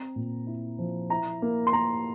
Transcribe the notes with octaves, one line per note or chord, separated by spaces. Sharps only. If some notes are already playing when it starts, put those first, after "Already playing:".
Already playing: C4 A#5
A#2
E4
F3
E4 A#5
A#3
C6
A#3 A#5